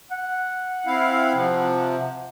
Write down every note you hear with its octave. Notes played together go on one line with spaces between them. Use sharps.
F#5
C4 E4 F5
C3 F3